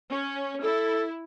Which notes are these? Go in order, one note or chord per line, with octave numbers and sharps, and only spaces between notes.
C#4
E4 A4